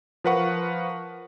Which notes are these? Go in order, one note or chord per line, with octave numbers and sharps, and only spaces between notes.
F3 A#4 B4 F5 F#5 C#6